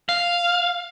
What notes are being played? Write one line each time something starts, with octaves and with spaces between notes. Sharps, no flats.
F5